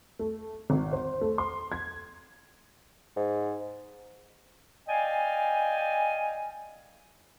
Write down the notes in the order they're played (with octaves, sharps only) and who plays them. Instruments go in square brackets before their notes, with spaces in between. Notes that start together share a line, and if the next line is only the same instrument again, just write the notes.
[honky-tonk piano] A3
G#1
C5
A3
C6
G#6
[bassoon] G#2
[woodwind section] D5 D#5 F5 G5 G#5